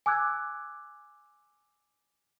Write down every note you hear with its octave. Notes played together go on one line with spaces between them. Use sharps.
G#5 D6 E6 F#6 G#6